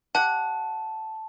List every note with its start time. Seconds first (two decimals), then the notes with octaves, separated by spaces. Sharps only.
0.15 G4 F#5 A5